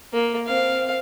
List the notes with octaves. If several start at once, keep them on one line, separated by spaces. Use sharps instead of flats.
A#3
C4 F5